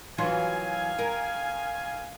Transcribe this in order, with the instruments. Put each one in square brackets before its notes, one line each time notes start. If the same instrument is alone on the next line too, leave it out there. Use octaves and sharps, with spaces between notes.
[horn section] D#3 F5 G#5 [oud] E3 F#3 F4
[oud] A#4